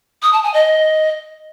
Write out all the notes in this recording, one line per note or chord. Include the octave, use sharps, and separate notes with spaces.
D#6
A5
G#5
D#5